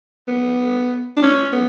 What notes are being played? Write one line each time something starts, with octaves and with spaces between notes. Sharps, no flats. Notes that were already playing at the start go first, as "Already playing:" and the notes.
B3
D4
C#4
B3